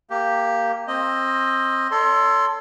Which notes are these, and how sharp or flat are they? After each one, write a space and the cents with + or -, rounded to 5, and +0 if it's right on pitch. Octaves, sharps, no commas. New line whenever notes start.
A#3 -10 G4 +0
C4 +20 D#5 +0
A4 +15 C#5 +40 C6 +5